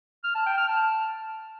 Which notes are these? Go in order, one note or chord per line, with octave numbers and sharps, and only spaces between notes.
F6
A5
G5
F6
A5